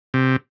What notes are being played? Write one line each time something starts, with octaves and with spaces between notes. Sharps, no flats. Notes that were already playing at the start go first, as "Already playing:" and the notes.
C3